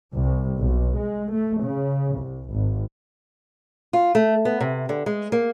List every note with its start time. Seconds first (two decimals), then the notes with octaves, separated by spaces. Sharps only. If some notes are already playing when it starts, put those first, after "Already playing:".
0.14 C2
0.60 B1
0.99 G#3
1.33 A3
1.62 C#3
2.19 C2
2.52 G#1
3.93 F4
4.15 A3
4.45 B3
4.60 C3
4.89 D3
5.06 G#3
5.32 A#3